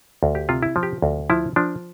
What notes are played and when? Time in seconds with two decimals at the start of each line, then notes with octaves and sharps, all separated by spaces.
0.23 D2
0.35 G4
0.49 C3 F4
0.63 E4
0.76 F3
0.83 G4
1.02 D2
1.30 F3 E4
1.56 F3 D4